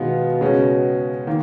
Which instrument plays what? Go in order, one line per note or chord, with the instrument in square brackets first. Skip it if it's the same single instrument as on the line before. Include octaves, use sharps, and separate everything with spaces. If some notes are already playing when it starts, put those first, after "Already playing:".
Already playing: [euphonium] B2 [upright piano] D#3 G#3 B3 F4
[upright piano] C#3 G#3 C#4 F#4
D#3 A#3